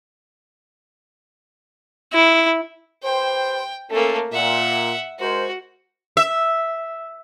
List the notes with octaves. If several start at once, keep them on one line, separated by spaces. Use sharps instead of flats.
E4
G4 B4 C5 G5
A3 A#3 C#4 A4
A#2 E5 F#5
G#3 F#4 A#4 C5
E5